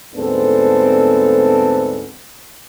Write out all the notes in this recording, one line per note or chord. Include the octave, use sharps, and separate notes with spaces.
D2 G#2 B3 C4 D4 A4